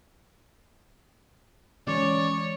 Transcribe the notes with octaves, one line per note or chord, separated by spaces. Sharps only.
D3 E3 G#3 C#4 C#5 D5